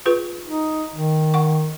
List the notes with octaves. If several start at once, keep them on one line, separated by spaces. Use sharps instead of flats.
F4 G#4 B4
D#4
D#3
F#5 C#6